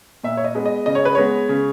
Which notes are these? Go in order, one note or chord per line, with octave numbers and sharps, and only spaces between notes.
A#2 E5
C#5
D#5
G#3 B3
D#5
C#3 D#5
C#5
B4
G#3 B3 C#5
C#3